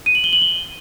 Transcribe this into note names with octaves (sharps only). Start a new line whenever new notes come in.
D#7
F#7
G7
F#7
G7